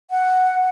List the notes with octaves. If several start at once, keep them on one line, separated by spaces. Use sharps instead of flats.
F#5